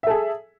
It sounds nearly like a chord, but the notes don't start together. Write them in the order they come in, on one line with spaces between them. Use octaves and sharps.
E5 A4 G#4